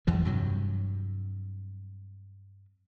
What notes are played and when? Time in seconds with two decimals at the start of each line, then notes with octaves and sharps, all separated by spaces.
0.07 E2 E3 F3
0.25 G2 C3 F#3